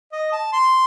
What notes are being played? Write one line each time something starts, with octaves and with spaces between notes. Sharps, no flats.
D#5
A5
C6